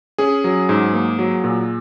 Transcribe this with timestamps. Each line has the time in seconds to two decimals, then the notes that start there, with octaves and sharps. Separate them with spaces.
0.18 C#4 G#4
0.44 F#3
0.69 G#2
0.94 A#3
1.19 F#3
1.44 A#2